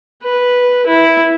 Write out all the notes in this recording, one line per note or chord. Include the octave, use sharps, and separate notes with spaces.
B4
E4